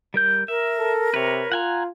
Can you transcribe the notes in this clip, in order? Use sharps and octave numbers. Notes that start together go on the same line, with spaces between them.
G3 A#4 G6
A#4 E5
A4
C3 B4 C#5
F4 F#5 G#5 A#5